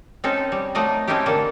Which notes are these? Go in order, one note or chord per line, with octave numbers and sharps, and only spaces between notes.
C4 C#4 D#4 A4
G3
F3 F#3 A3 D#4 D5 D#5
A3 C4 C#4 D#4 E4 G4
D3 A#3 D4 A4